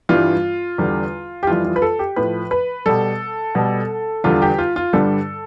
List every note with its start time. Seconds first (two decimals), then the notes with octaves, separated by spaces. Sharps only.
0.09 G2 E3 G3 F4
0.78 E2 D3 G3
1.43 G4
1.47 F2 E3 G3 F4
1.65 F4
1.76 B4
1.82 A4
1.99 G4
2.16 A2 F3 B4
2.51 B4
2.86 B2 G3 A4
3.55 B2 G3
4.24 E2 D3 G3 F4
4.42 G4
4.59 F4
4.76 F4
4.93 G2 D3 G3 A4